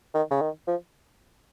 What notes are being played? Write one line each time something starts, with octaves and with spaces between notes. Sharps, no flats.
D#3
C#3
D#3
F3